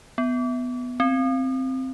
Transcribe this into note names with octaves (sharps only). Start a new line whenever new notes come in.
B3
C4